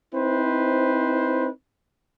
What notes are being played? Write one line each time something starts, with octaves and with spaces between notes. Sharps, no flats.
C4 D#4 E4 B4 C5